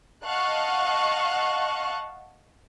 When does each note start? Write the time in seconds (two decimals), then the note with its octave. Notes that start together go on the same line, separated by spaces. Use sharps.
0.24 D#5 F5 F#5 A5 C#6 F#6